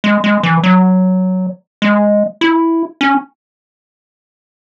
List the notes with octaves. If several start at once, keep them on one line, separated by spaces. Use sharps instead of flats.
G#3
G#3
E3
F#3
G#3
E4
C#4